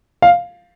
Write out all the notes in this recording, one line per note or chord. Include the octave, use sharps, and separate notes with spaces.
F5